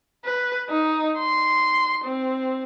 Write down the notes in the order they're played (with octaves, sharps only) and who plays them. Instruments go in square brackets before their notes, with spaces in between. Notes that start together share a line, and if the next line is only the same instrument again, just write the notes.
[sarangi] B4
D#4
C6
C4